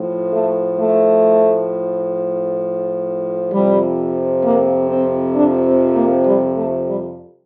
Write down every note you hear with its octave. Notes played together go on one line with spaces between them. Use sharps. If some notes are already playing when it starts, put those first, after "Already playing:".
Already playing: A2 F3
A3
A3
F2 C3 F3 G3
A#3
C4
D4
C4
A#3
G3
A3
G3